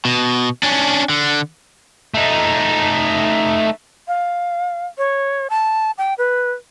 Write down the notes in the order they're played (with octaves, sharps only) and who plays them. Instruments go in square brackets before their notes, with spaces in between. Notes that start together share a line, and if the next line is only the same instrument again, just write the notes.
[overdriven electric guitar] B2
C#4 D4
D3
[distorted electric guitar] A3 D#4
[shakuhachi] F5
C#5
A5
G5
B4